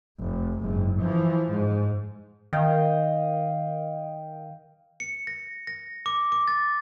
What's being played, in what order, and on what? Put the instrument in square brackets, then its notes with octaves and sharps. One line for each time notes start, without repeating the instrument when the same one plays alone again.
[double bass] F1
F#1 G#2
E3 F3
G#2
[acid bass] D#3 [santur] D#5 F5 G5
[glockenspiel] C#7
A#6
A#6
D6
D6
A6